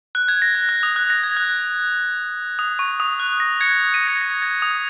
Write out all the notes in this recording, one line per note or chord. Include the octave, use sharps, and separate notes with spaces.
F#6
G#6
A#6
G#6
F#6
D#6
F#6
A#6
G#6
F#6
D#6
C#6
D#6
F#6
A#6
G#6 C#7
A#6 D#7
G#6 C#7
A#6
G#6
D#6